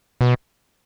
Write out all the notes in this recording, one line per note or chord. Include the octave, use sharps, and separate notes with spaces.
B2